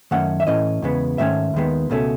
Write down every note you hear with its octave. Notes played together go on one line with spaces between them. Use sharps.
F#2 D#3 A3 C#4 F#5
E5
A2 E3 A3 C#4 D#5
E2 C#3 G#3 B3
G#2 D#3 A3 C#4 E5
D#2 D#3 G#3 B3
C#2 B2 A3 C#4